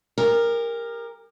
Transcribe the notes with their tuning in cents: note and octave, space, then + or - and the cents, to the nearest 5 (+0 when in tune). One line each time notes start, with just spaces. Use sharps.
G4 +45 A#4 +0